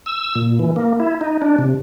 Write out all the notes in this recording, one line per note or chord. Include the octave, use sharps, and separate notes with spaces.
E6
A#2
E3
A#3
E4
D#4
D4
C3